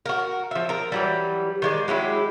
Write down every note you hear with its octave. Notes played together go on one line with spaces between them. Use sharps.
F#4 A#4
F3 E5
A#4 A#5
E3 F#3 G3
D#3 G#3 D5
F#3 G#3 E4 G4